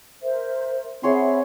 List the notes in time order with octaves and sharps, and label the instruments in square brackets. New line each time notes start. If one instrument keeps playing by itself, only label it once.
[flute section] A#4 C5 E5
[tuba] C4 [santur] G#4 C#5 C6 [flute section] E5 F#5 B5